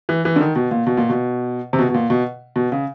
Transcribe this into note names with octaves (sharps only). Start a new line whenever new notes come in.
E3
E3
D3
D#3
B2
A#2
B2
A#2
B2
C3
B2
B2
A#2
B2
B2
C#3